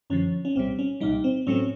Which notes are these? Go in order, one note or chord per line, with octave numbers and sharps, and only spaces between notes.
F#2 D3 F3 C#4
C#4
C2 A#2 G3 C4
C#4
C2 A#2 G3 D#4
C4
A2 F#3 A3 C4 C#4